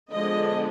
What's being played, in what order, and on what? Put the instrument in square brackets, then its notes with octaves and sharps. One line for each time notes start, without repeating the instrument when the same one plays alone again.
[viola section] D3 F3 G#3 B3 D4 D#5